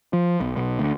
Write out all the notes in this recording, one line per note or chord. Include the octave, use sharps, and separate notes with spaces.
F3
B1
B1
D2